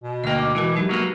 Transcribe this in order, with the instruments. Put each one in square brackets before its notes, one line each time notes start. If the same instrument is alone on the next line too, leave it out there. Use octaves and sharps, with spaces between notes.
[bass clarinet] B2
[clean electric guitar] D2 A#3 [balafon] D#5 G5
[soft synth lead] D6
[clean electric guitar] E3 [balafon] G#3 F#4 A#4
[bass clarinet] C3 [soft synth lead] F#3 [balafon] G#3 D#4 G4
[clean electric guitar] F#3 A#3 B3 [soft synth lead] F#4